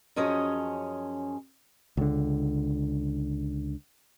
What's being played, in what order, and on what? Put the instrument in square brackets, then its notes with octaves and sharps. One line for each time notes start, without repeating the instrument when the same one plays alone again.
[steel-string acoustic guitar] F#2 F3 C#4 G#4 C#5 D#5
[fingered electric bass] C#2 D3